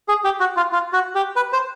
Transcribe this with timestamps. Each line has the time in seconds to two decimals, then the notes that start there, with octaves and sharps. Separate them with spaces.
0.08 G#4
0.24 G4
0.40 F#4
0.57 F4
0.72 F4
0.93 F#4
1.15 G4
1.36 B4
1.53 C5